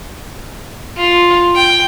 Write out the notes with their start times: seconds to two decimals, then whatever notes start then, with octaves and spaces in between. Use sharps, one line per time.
0.97 F4
1.55 G5